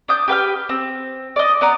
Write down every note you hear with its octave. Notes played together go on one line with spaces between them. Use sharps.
D4 D#6 G6
G4 B4 G5 F6
C4
D5 D#5
B3 D5 A#5 D#6